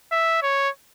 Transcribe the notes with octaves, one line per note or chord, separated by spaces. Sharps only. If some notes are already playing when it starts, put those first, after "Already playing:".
E5
C#5